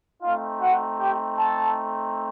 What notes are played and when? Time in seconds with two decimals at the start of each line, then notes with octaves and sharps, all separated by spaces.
0.23 A3 C4 D#4 F4 F5
0.61 F#4 F#5
1.00 G4 G5
1.38 A4 A5